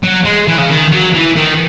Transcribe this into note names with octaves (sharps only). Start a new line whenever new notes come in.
F#3
G#3
E3
C#3
D#3
F#3
E3
D#3